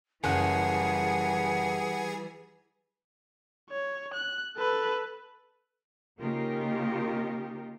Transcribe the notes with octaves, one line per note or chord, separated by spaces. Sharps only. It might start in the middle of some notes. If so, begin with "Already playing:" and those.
F#1 E3 G3 G#4 F#5 F#6
C#5
F#6
A4 B4
C#3 A#3 D#4 F4 G4 A#4